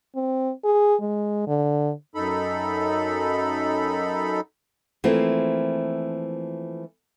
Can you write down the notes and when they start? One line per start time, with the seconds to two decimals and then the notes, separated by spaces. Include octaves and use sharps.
0.15 C4
0.64 G#4
1.01 G#3
1.47 D3
2.15 F#2 D#4 A4 B5
5.04 E3 F3 A3 A#3 C4 F4